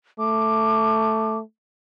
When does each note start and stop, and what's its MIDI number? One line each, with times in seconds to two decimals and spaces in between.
0.19 1.41 57
0.19 1.38 86